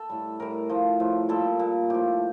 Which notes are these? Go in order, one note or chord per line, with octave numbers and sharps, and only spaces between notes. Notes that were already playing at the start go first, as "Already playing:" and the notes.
Already playing: A4
A2 G3
A2 G3 A#4
A2 F3
A2 F3
A#2 G3 A4
A#2 G3
A2 F3 G4